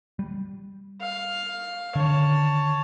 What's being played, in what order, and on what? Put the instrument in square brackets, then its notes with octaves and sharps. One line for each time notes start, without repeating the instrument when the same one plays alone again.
[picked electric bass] G3
[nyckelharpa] F5
[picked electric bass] D3 D#3 [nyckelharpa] C#5 A5